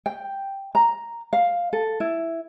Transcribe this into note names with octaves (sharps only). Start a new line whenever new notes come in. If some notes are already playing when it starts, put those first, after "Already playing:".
G5
A#5
F5
A4
E4